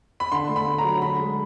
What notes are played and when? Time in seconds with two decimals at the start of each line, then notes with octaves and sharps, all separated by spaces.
0.20 B5
0.32 D3 C6
0.49 A3
0.56 B5
0.67 D3
0.78 A#5
0.84 F#3
1.01 D3 B5
1.19 G#3